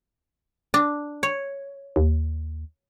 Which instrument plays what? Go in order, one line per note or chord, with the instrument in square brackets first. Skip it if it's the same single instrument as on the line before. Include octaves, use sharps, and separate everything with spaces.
[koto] D4
C#5
[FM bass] D#2